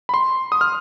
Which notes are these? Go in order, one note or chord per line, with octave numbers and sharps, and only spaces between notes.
B5
C6
D#6
F6